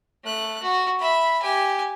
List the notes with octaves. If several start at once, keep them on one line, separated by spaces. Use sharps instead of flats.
A3 F#6
F#4
E5 B5
G4 G#5